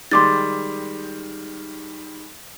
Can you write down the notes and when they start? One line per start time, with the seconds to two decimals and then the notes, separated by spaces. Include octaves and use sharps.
0.11 D#3 G3 G#3 C6 D6 A6